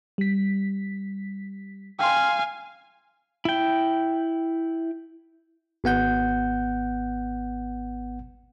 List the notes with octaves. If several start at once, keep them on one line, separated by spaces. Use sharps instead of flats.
G3 B6
F5 G5 G#5 C6
E4 G5
G#1 B3 F#5 G6